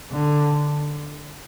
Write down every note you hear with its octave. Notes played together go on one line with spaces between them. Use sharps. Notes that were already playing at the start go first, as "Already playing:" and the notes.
D3